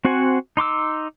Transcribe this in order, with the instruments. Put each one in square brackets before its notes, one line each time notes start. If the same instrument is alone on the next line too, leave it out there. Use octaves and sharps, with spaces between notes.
[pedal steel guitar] C4 F#4 C5 F#5 G#5
D#4 C6 D6 E6